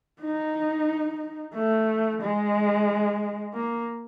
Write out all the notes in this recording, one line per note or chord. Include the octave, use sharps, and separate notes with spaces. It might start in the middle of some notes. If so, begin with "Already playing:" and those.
D#4
A3
G#3
A#3